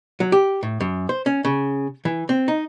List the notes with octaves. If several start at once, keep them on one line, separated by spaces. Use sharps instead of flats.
F#3
G4
A2
F#2
C5
C#4
C#3
E3
C4
D#4